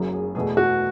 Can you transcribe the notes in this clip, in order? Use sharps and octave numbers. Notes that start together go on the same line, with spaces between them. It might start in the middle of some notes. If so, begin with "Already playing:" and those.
Already playing: F#1 F#2 C#3 F#3
G#4
E2 B2 A3 G#4
F#4